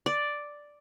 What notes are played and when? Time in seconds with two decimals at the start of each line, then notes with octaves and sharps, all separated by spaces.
0.06 D5